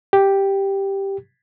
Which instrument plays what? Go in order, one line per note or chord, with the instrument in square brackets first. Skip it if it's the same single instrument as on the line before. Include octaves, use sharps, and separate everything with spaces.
[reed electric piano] G4